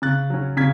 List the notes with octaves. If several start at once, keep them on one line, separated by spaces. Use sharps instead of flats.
C#3 F#6 A6
F#3 C#4
C#3 G#6 B6